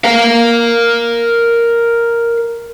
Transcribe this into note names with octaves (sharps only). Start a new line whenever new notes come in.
A#4 F5